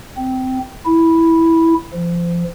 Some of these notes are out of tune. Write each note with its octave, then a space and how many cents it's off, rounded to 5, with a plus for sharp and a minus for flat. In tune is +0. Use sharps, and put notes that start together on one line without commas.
C4 -15
E4 -5
F3 -25